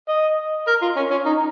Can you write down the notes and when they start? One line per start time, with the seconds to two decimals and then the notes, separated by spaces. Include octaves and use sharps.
0.09 D#5
0.67 A#4
0.82 F4
0.96 C#4
1.11 C#4
1.25 D#4